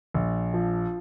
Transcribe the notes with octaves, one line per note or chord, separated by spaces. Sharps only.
A#1
F3